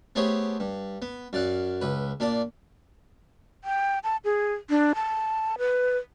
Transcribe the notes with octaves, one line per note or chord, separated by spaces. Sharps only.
A3 B3 G4 G#4 C5 C#5
G2
B3
F#2 D5 F5 F#5
C#2 B4
A#2 D4 F4 D5
G5
A5
G#4
D4
A5
B4